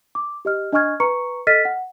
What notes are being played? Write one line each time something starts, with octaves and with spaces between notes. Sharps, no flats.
D6
G4 D#5 F6
D4 D#5 G#5 C#6 F6 G#6
B4 A#5 C#6 C#7
A4 D#5 F6 A6 B6 D#7
F#5